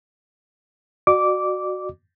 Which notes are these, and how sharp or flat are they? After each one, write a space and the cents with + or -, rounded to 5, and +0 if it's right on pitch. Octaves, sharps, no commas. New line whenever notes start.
F#4 +0 D5 +45 D6 -10